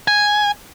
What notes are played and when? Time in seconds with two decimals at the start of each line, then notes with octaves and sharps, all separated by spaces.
0.08 G#5